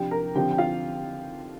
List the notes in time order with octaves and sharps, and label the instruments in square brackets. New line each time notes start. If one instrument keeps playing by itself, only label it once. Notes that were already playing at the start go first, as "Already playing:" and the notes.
Already playing: [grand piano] C3 F3 D4 G4 G5
A#4 A#5
D3 F3 C4 G4 G5
G5
F4 F5